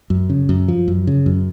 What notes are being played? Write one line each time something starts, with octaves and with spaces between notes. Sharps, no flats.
F#2
C#3
F#2
F3
F#2
C#3
F#2